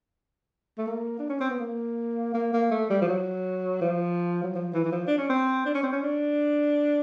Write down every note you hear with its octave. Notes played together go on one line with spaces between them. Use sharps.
A3
A#3
D4
C#4
C4
B3
A#3
A#3
A#3
A3
G3
F3
F#3
F3
F#3
F3
E3
E3
F3
D4
C#4
C4
D4
C#4
C4
C#4
D4